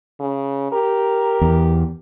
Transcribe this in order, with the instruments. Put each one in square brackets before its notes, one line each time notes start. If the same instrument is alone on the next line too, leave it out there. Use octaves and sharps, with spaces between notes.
[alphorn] C#3
[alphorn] G4 [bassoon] A#4
[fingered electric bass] E2